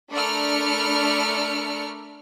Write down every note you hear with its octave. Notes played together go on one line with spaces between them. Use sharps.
A3 D4 A#4 B5 F6 C#7